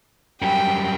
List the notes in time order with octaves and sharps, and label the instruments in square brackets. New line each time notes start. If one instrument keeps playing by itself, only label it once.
[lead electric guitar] F#2 G3 [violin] G5